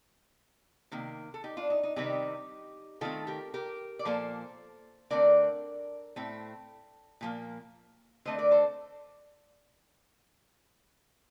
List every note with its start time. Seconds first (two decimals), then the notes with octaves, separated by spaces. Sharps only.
0.92 C3 D#3 A#3
1.34 A4
1.44 D#4 G4
1.57 D4 F4
1.70 D#4
1.83 D#4
1.96 C3 D#3 G3 C4 D#4 G4
3.01 D#3 A3 C4 F4 A4
3.27 G4 A#4
3.54 G4 A#4
3.99 D5
4.05 A#2 F3 A#3 A4 C5
5.10 D3 A3 C4 A#4 D5
6.16 A2 A3 C4
7.21 A#2 F3 A#3
8.25 D3 A3 C4 C5 D#5
8.38 A#4 D5
8.51 A4 C5